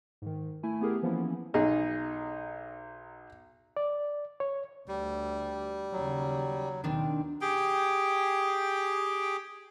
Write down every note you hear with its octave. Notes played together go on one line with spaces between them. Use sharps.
G#2 D#3
A3 E4 G#5
A3 B3 E4 G4 G#4 A#4
E3 F3 A#3 B3 C#4 E4
B1 D#4 G#4 D#5
D5
C#5
D2 G3
D#2 C#3 F#3
D#2 B2 D#3 C4 D4
G4 G#4 G5